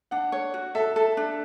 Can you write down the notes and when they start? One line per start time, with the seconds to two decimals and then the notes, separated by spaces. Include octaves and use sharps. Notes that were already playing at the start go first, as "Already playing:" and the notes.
0.11 D4 F#5
0.32 C#5
0.54 F#4
0.75 A4 E5
0.96 A4
1.17 D4